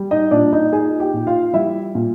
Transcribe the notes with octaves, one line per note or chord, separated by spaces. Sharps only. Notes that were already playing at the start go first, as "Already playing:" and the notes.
Already playing: G3
D#4 D#5
A#2 D4 D5
D#4 D#5
D#4 G#4 G#5
G4 G5
A#2
F4 F5
G3 E4 E5
A#2